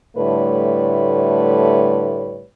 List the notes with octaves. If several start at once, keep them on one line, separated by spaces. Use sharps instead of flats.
A2 D3 G3 A3 B4 C#5